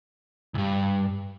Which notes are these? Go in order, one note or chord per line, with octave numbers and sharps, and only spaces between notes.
C#2 G2